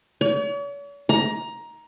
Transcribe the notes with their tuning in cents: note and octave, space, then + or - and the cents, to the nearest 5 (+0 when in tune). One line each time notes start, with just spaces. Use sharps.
C#5 +45
A#5 +15